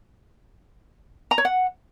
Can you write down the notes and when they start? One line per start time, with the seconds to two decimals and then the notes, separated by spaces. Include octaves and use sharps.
1.31 A#5
1.38 C#5
1.45 F#5